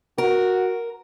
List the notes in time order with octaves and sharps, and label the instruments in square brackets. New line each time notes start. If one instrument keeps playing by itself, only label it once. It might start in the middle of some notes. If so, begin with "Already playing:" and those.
[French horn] F#4 [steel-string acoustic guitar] A#4